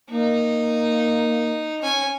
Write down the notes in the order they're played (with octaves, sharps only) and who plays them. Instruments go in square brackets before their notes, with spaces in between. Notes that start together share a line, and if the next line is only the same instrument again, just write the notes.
[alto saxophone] A#3 [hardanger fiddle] D#4
[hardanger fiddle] C#4 G#5